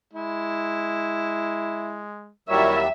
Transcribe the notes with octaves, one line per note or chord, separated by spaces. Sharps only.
G#3 E4
D#2 F#3 G3 E4 A#4 C#5 E5